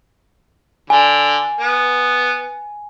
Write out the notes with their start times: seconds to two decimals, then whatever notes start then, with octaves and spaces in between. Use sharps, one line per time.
0.90 D3 G#5
1.60 B3